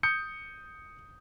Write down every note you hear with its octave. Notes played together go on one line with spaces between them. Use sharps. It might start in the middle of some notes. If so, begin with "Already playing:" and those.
D#6 G6 C#7